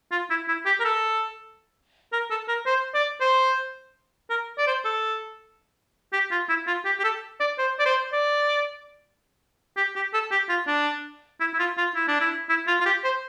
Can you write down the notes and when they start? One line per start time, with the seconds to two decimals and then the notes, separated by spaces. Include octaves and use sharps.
0.12 F4
0.30 E4
0.48 E4
0.66 G4
0.80 A#4
0.85 A4
2.13 A#4
2.31 A4
2.48 A#4
2.66 C5
2.95 D5
3.21 C5
4.30 A#4
4.58 D5
4.67 C5
4.85 A4
6.13 G4
6.31 F4
6.49 E4
6.67 F4
6.85 G4
6.99 G4
7.04 A4
7.40 D5
7.58 C5
7.79 D5
7.86 C5
8.13 D5
9.77 G4
9.96 G4
10.14 A4
10.31 G4
10.49 F4
10.67 D4
11.40 E4
11.54 E4
11.59 F4
11.78 F4
11.95 E4
12.08 D4
12.21 E4
12.49 E4
12.67 F4
12.80 F4
12.86 G4
13.04 C5